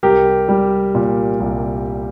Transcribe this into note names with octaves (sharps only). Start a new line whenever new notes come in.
C2 G4 A#4
G3
A#2
C2